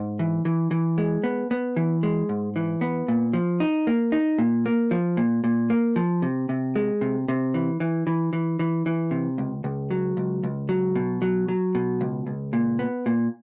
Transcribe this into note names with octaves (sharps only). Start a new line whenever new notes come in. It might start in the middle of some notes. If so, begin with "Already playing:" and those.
Already playing: G#2
E3
E3
E3
G#3
B3
B3
E3
G#3
G#2
E3
B3
A#2
F3
D#4
A#3
D#4
A#2
A#3
F3
A#2
A#2
A#3
F3
C3
C3
G#3
C3
C3
E3
E3
E3
E3
E3
E3
C3
C#2
C#2
F#3
C#2
C#2
F#3
B2
F#3
F#3
B2
C#2
C#2
A#2
B3
A#2